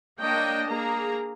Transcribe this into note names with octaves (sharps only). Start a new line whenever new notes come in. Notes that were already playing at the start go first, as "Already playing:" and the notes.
A#3 D4 C#5 D#5 G5
A#3 G#4 A#5